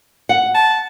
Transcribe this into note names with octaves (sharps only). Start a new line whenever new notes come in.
F#5
A5